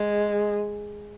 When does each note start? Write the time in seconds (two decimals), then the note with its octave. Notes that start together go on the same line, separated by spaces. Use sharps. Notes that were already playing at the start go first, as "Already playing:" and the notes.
Already playing: G#3